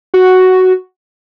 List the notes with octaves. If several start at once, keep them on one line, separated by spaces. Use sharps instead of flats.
F#4